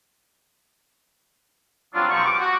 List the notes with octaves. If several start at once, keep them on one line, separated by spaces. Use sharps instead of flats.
F#3 G3 C4 D4 F4
B2 F3 F#3 G#3 G4 C#6
D6
F#4